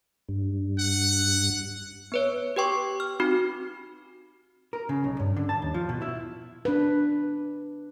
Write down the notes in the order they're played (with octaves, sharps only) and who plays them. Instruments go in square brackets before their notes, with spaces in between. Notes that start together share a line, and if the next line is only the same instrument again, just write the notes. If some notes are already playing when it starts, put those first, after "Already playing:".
[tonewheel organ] G2
[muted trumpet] F#5
[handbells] B3 B4 C#5
G4 B4 G5 C#6 D6
F6
C4 D#4 F#4 B5
[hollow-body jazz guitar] A#4
C#3
B1
G2
D3
A5
D#2
F3
B2
E4
[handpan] D4 B4